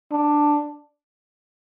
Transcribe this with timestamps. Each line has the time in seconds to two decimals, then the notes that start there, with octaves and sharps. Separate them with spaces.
0.12 D4